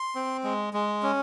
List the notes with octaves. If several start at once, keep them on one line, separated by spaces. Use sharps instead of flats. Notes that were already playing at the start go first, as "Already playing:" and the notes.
Already playing: C6
C4
G#3
G#3
C#4